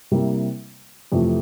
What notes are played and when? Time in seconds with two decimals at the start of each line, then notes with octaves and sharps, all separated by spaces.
0.11 C3 G3 A#3 E4
1.12 F2 C3 E3 A3